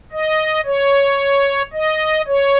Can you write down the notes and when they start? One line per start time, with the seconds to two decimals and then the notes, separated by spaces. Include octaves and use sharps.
0.12 D#5
0.65 C#5
1.73 D#5
2.27 C#5